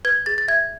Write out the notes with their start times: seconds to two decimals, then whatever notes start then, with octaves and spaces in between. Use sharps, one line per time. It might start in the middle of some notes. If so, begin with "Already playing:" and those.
0.05 B4 G#6
0.26 G#4 A6
0.38 A6
0.48 E5 G#6